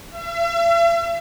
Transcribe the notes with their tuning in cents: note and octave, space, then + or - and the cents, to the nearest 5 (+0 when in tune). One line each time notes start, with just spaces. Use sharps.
E5 +45